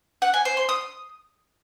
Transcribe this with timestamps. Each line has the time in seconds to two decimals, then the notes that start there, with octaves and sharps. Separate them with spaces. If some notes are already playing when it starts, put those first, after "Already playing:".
0.22 F#5
0.34 G#5
0.45 C5
0.57 C6
0.69 D#6